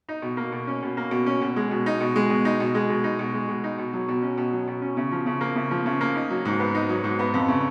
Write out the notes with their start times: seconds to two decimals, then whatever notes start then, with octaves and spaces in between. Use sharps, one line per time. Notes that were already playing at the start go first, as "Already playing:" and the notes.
0.09 D#4
0.22 B2
0.37 A#3
0.52 B2
0.67 C#4
0.83 B2
0.97 A#3
1.11 B2
1.26 C#4
1.42 B2
1.56 G#3
1.71 B2
1.86 D#4
2.01 B2
2.16 G#3
2.30 B2
2.45 D#4
2.60 B2
2.75 G#3
2.90 B2
3.04 D#4
3.19 B2
3.34 G#3
3.49 B2
3.64 D#4
3.78 B2
3.93 F#3
4.08 B2
4.23 C#4
4.38 B2
4.53 F#3
4.68 B2
4.82 C#4
4.97 C#3
5.12 F3
5.26 C#3
5.41 A#3
5.56 C#3
5.71 F3
5.86 C#3
6.01 A#3
6.15 D#4
6.30 F#3
6.45 G#2
6.60 B3
6.75 D#4
6.89 F#3
7.04 G#2
7.19 B3
7.34 F2
7.48 C#3